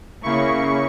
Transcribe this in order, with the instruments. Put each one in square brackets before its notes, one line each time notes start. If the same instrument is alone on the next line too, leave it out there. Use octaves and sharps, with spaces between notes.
[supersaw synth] C#3 C#6 [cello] A#3 E4